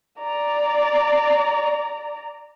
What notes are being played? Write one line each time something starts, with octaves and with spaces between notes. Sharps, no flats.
D5 A#5